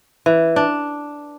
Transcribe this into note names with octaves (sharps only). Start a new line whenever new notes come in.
E3
D4